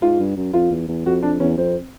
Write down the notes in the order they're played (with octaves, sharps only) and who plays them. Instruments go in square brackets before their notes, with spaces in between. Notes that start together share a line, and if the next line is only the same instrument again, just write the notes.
[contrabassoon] G#2 [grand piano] F4
[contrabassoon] G2
F#2
[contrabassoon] F2 [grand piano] F4
[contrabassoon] E2
E2
[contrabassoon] F2 [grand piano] F#4
[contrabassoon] F2 [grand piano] D4
[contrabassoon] E2 [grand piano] C#4
[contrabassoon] F2 [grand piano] C4